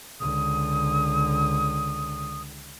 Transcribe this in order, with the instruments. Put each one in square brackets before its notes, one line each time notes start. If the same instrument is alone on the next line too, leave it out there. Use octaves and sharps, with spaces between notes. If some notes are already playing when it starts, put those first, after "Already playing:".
[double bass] C#2 D3 [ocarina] D#6